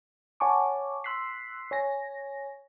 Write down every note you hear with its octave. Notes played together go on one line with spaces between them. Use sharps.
C#5 F#5 G#5 A5 C#6 D6
C6 E6 F#6 B6 C7
C#5 G#5 A#6